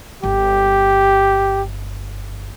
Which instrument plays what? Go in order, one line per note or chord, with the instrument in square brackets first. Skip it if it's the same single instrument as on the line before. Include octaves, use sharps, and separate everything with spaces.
[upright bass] G1 [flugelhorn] G4